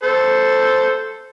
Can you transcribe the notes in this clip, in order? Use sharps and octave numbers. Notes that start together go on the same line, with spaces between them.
A4 C5